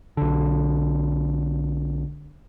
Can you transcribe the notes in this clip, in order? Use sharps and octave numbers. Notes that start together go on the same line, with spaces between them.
B1 D3